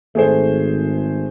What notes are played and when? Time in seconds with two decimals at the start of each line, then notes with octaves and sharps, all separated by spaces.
0.15 G#1 A3 G#4 C5